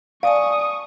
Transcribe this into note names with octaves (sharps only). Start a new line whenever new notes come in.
D5 F5 G#5 A5 C#6 D#6